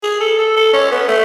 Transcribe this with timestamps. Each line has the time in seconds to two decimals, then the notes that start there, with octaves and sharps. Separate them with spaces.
0.03 G#4
0.20 A4
0.38 A4
0.56 A4
0.73 C#4
0.91 B3
1.08 A3